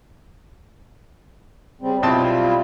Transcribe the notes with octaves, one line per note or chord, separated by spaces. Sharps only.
C#3 G3 C4
B1 G3 C4 E4 F4 A5